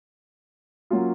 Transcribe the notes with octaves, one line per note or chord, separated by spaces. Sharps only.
F#3 A#3 C#4 F4